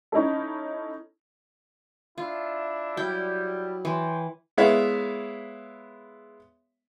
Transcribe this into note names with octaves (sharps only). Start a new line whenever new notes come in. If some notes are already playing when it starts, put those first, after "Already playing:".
C#4 D#4 E4 A4
D4 E4 F4 E5
F#3 G3 E4 G5
E3 C#5 G5 C6
G#3 B3 E4 C#5 E5 F5